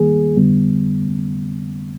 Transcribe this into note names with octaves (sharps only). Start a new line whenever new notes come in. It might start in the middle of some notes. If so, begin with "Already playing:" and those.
Already playing: D#2 D#3 G3 A#3 G#4
F2 D3 G3 B3